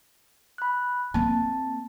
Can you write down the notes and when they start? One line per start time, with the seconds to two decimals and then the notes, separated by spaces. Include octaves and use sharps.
0.58 B5 F#6
1.14 A#3 C4 A5